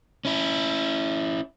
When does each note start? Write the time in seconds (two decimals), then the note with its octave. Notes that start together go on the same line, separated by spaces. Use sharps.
0.25 C#4 E4